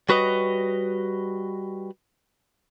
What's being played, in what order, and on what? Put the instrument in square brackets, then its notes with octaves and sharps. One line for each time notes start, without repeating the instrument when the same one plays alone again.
[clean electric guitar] G3 F#4 B4 C#5 D#5